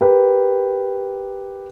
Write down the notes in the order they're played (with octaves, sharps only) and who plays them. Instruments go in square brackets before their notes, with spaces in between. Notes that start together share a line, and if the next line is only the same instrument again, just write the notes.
[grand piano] G4 A#4 B4